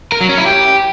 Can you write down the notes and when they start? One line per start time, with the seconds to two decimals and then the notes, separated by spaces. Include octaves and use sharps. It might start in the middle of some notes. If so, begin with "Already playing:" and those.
0.12 A#4
0.21 F#3
0.29 C#4
0.38 E4
0.46 G4